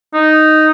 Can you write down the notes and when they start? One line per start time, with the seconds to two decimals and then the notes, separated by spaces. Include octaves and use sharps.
0.13 D#4